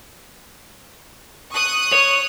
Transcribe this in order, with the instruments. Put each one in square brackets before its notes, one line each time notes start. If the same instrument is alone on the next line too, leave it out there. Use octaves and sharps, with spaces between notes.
[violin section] C#6 D#6 F#6
[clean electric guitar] C#5